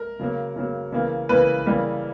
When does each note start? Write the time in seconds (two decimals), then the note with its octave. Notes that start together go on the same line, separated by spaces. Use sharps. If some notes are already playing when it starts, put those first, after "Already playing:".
Already playing: A#4
0.19 C#3 F#3 A#3
0.56 C#3 F#3 A#3
0.92 C#3 E3 A#3
1.29 C#3 E3 A#3 B4
1.66 C#3 E3 G3 A#3